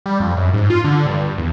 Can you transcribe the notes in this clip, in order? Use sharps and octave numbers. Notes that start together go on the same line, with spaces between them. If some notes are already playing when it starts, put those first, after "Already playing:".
G3
F2
F#2
G#2
F4
D3
G2
G2
E2